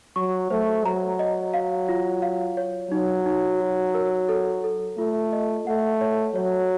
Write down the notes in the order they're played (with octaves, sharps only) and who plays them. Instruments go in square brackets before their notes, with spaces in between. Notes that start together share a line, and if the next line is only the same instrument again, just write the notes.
[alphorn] F#3 [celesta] C#6
[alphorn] A3 [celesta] C5
[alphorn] F#3 [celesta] A#5
[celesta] D#5
F5
F4
F5
C#5
[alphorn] F#3 [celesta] D#4
[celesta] D#4
F#4
A#4
A4
A4
[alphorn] A3 [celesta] F4
[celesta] D#5
[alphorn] A3 [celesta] F#5
[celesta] C#5
[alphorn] F#3 [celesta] C#5